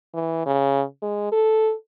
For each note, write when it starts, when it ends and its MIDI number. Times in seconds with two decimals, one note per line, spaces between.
0.14 0.45 52
0.46 0.83 49
1.02 1.30 56
1.32 1.73 69